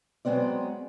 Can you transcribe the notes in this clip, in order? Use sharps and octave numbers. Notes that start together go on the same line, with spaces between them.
F#3 G#3 B3 C4 D5